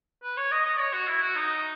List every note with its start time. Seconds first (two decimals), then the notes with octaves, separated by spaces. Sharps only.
0.23 B4
0.37 C#5
0.51 D#5
0.66 D#5
0.79 C#5
0.93 F#4
1.07 E4
1.22 F#4
1.35 D#4